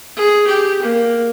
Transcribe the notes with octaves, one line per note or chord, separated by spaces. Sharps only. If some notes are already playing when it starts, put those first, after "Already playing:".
G#4
G4
A#3